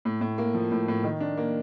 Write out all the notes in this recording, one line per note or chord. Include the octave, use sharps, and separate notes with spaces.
A2
A2
A#3
F3
A2
A2
D#3
D4
A#3